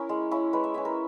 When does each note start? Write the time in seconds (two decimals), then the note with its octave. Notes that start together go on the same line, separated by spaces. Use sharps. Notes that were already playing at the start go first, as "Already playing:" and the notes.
Already playing: C#4 E4 A#4
0.09 G#3
0.31 C#4 E4
0.53 G#3 B4
0.64 E5
0.74 C#4 E4 E5
0.85 A#4